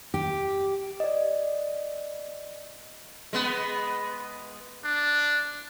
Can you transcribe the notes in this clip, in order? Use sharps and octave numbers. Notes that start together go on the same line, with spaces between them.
G4
D5 D#5
G#3 B3
D4